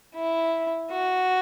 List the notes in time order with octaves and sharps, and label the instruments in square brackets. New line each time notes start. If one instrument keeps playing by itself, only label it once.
[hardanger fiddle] E4
F#4